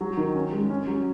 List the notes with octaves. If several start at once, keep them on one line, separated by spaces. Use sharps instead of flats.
F#3
D#3
C#4
G#3
C#4
F#3